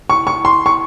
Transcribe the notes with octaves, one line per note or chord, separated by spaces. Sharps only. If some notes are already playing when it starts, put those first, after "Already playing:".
C#6
C#6
C6
C#6